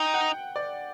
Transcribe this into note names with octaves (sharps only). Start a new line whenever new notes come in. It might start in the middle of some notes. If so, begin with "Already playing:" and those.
Already playing: D#4 G5
F#5
D5